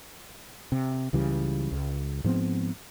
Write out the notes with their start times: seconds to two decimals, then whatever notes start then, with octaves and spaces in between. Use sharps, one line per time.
0.72 C3
1.13 C#2 C#3 E3 G3
1.72 C#2
2.24 G#2 F3 B3 C4